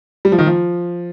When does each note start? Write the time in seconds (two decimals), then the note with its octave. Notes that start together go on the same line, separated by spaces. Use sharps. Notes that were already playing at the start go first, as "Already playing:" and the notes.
0.25 G3
0.32 F3
0.38 D#3
0.47 F3